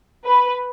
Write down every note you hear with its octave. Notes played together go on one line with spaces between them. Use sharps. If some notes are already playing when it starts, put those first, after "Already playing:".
B4